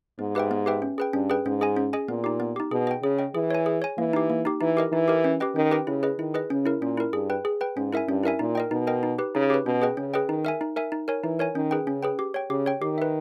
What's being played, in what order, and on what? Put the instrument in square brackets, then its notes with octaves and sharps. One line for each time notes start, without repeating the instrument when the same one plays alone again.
[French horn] G#2 [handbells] B3
[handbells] G4 B4 E5 G5
B3
G4 B4 E5 G5
C#4
G#4 B4 G5
[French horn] G2 [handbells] C#4
[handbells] G#4 B4 G5
[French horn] G#2 [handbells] C#4
[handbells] G#4 D#5 G#5
C#4
G#4 D#5 G#5
[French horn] A#2 [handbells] B3
[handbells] D#4 G4
B3
D#4 G4
[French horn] B2 [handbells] G#4
[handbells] D#5 G5
[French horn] C#3 [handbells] G#4
[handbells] D#5 G5
[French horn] E3 [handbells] G#4
[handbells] C#5 G#5
G#4
C#5 G#5
[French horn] E3 [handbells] A#3
[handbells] D#4 G4
A#3
D#4 G4
[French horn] E3 [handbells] D#4
[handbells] G4 A#4 D#5
[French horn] E3 [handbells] D#4
[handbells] G4 A#4 D#5
C#4
G4 B4 D#5 G5
[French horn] D#3 [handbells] C#4
[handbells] G4 B4 D#5 G5
[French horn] C#3 [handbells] E4
[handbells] G#4 B4 D#5
[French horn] D#3 [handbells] E4
[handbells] G#4 B4 D#5
[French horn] C#3 [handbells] C#4
[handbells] E4 A#4
[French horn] A#2 [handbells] C#4
[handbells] E4 A#4
[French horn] G2 [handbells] G#4
[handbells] B4 G5
G#4
B4 G5
[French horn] G#2 [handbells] C#4
[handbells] E4 A#4 E5 G#5
[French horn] G2 [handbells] C#4
[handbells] E4 A#4 E5 G#5
[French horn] A#2 [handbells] D#4
[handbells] A#4 D#5 G5
[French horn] B2 [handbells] D#4
[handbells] A#4 D#5 G5
D#4
G4 B4
[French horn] C#3 [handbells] D#4
[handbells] G4 B4
[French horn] B2 [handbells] C#4
[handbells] G#4 B4 D#5 G5
[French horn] C#3 [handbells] C#4
[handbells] G#4 B4 D#5 G5
[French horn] D#3 [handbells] D#4
[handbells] A#4 E5 G#5
D#4
A#4 E5 G#5
D#4
A#4 C#5 G#5
[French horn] E3 [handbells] D#4
[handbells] A#4 C#5 G#5
[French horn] D#3 [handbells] C#4
[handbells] G#4 B4 G5
[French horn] C#3 [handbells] C#4
[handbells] G#4 B4 G5
G4
C#5 G5
[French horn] C#3 [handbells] G4
[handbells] C#5 G5
[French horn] D#3 [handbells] G4
[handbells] B4 E5